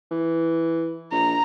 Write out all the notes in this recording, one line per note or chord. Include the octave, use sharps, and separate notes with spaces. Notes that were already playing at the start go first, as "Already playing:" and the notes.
E3
A#1 A#5